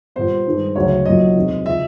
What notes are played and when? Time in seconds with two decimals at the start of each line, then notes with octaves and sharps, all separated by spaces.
0.16 A#2 G3 B3 C5
0.46 G2 D#3 G#3
0.76 D2 C#3 F#3 C#5
1.05 B1 A#2 F#3 A#3 D#5
1.35 E2 C3 D#3 G#3 C4
1.66 C#3 F3 E5